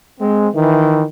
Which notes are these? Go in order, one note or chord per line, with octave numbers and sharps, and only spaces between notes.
G#3 C4
D#3 E3